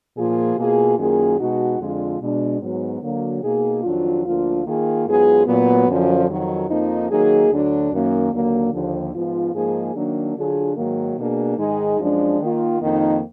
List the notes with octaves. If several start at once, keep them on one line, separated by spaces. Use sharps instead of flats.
A#2 F3 A#3 F4 G#4
B2 A#3 F4 G#4
F#2 D#3 A#3 F4 G#4
B2 G#3 D#4 F#4
F2 D3 G#3 D4 F4
B2 G#3 D4
G#2 F#3 B3
D3 F#3 A#3
B2 A#3 D#4 G#4
F2 D#3 F#3 D4 F4
D2 D3 F3 A#3 F4
D#3 A#3 F4 G#4
G#2 F#3 B3 F4 G#4
A#2 F#3 B3
F#2 D3 F3
F2 D#3 F#3
F2 F3 A#3 D#4
D#3 F#3 A#3 D#4 G#4
D2 D3 F#3 D4
F#2 D#3 A#3
D#2 D3 F#3 A#3
D#2 D3 F3
G#2 F3 B3 F4
G#2 F3 A#3 D#4 G#4
D#3 F#3 A#3 D4
D3 F#3 D4 F4 G#4
G#2 D#3 F#3 A#3
B2 A#3 D4 G#4
G#2 D#3 G#3 D#4 G#4
F#2 F3 G#3 D4
D#3 A#3 F4
F2 D#3 A#3 D#4